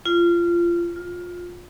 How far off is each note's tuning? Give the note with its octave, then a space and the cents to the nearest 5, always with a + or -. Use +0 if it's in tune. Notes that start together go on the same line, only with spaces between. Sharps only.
F4 -20
F4 +20